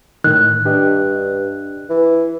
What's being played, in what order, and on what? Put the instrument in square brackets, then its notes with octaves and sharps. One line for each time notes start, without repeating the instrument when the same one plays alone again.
[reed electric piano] A2 D#3 [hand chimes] F#6
[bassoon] G2 [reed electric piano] D4 G4 D#5
[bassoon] E3